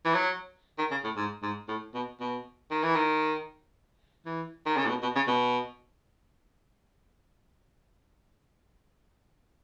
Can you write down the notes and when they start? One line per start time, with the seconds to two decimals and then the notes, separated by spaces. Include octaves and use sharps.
0.05 E3
0.14 F#3
0.79 D#3
0.91 C#3
1.04 A2
1.17 G#2
1.43 G#2
1.68 A2
1.94 B2
2.20 B2
2.71 D#3
2.83 E3
2.95 D#3
4.25 E3
4.66 D#3
4.77 C#3
4.85 A2
4.89 B2
5.03 B2
5.16 C#3
5.27 B2